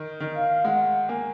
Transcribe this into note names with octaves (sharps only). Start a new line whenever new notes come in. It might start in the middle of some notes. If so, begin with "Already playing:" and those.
Already playing: D#3
D#3
F5
G#3 F#5
A#3 G#5